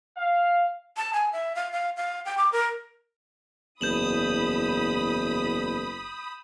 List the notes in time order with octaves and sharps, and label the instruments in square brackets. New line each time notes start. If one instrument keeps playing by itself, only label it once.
[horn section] F5
[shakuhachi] A5
G#5
E5
F5
F5
F5
G5
D6
A#4
[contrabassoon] F#1 [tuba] E2 [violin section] B5 D#6 [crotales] G6 E7 F#7